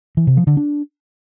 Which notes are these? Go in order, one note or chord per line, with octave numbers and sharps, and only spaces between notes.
E3
C3
F3
D3
D4